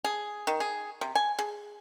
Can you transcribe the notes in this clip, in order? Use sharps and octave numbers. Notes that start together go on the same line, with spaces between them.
G#4
D#3
G#4
C3
G#5
G#4